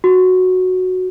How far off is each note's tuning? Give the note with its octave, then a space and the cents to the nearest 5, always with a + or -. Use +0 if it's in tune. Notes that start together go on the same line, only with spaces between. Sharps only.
F#4 -5